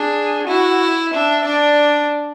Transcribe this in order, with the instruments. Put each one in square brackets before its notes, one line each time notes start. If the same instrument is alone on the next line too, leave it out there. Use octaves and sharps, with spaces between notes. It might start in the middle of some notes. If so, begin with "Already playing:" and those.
Already playing: [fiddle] D4 [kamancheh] G#4
[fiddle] E4 [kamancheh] F#4
[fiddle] D4 [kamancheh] E5
[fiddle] D4 [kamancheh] D5